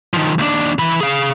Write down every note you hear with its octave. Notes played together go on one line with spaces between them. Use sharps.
D#3 F3
D#2 D4
E3 B5
G#4 F5